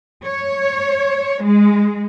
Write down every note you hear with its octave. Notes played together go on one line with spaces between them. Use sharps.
C#5
G#3